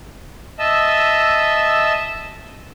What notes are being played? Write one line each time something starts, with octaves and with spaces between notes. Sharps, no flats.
D#5 E5 A5 E6